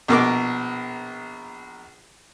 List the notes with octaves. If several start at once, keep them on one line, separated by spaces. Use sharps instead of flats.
A#1 B2 A#4 A#5 D6